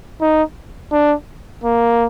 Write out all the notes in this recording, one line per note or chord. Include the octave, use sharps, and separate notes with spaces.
D#4
D4
A#3